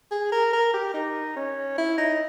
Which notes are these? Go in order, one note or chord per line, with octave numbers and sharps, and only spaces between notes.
G#4
A#4
A#4
G4
D#4
C#4
E4
D#4